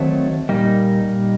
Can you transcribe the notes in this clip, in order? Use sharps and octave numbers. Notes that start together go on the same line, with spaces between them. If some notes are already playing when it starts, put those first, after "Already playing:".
Already playing: D#3 F#3 A3 C4 D#4 A5
A#2 G3 A#3 D#4